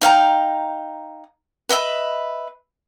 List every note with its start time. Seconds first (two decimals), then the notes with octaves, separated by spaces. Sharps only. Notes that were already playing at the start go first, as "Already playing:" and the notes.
0.01 D#4 F5 G5 A#5
1.69 B4 D#5 E5 B5